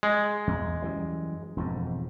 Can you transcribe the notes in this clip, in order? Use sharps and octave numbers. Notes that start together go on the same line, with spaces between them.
G#3
E2
F#2 E3 G3
E1 F2 G#2